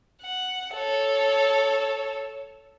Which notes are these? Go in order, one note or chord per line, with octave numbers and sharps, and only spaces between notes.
F#5
A4 C#5